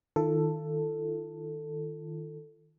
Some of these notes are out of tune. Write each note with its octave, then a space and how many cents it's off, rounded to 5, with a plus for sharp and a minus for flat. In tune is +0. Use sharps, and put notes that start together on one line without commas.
D#3 +0 F4 -35 A4 +10